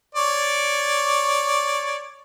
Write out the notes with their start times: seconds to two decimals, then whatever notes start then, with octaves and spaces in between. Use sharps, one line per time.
0.15 C#5 D5